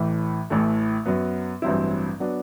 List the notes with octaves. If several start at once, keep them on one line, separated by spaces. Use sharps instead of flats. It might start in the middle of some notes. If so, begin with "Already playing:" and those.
Already playing: A1 A2 E3
A1 A2 E3 A3
F#2 F#3 B3
A1 G2 F#3 C4 E4
F#3 B3 D4